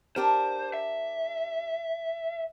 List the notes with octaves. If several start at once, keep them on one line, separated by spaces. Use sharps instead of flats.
D4 G4 A#4 C5
E5